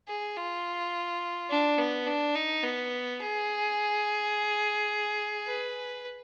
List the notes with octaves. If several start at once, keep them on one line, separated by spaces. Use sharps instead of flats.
G#4
F4
D4
B3
D4
D#4
B3
G#4
B4